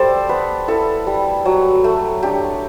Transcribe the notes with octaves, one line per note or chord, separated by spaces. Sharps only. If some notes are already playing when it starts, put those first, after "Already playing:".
Already playing: G3 A4 C5 D5
B3 B4
E4 A4
G3
F#3
A3
D4 G4